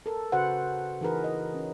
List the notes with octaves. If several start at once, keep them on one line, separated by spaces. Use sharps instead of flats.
A4 A#4
C#3 F#4 B4 C5 F#5
E3 D#4 G#4 A#4 B4
D#5
C#4